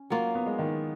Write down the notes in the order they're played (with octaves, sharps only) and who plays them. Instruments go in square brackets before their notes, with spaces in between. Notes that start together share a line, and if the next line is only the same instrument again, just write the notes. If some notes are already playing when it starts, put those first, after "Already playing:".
Already playing: [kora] C#4
F#3 A#3 F4
[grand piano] B3
G#3
D#3